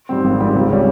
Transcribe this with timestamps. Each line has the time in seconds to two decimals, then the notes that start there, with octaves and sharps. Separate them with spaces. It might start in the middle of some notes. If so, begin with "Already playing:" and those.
0.09 G#2 G3 C4
0.24 G#1
0.39 G#2 G3 C4
0.55 C#2
0.71 C#3 G3 C#4